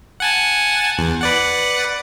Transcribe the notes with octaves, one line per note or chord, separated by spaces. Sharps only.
F#5 G#5 A5
E2
B4 D5 F#5